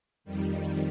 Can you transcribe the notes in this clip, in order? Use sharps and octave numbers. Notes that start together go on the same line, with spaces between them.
F2 D#3 G3